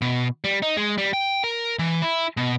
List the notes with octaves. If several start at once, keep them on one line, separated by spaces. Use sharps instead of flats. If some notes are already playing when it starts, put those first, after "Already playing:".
B2
G3
D#4
G#3
G3
G5
A#4
E3
E4
B2